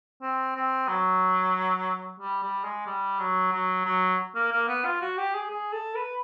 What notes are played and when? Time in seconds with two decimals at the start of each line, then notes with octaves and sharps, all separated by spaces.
0.22 C4
0.56 C4
0.88 F#3
2.20 G3
2.43 G3
2.64 G#3
2.86 G3
3.19 F#3
3.52 F#3
3.85 F#3
4.35 A#3
4.52 A#3
4.68 B3
4.85 F4
5.01 F#4
5.17 G4
5.34 G#4
5.50 G#4
5.73 A4
5.95 B4